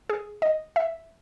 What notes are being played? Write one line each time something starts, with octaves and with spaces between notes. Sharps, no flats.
G#4
D#5
E5